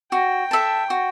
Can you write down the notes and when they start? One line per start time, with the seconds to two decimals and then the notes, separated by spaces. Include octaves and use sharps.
0.12 F#4 G5
0.51 A4 E5 A5
0.90 F#4